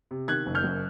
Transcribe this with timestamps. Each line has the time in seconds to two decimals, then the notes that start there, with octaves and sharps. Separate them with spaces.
0.11 C3
0.28 D#3 F#6 G#6
0.46 F#1
0.55 F6 G6
0.64 F#2